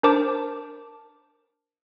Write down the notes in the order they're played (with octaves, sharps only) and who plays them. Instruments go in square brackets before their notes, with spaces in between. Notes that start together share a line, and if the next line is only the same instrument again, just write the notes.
[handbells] D4 A#4 C5 A5 D6